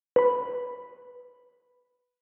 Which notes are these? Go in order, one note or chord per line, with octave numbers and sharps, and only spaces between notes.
B4 B5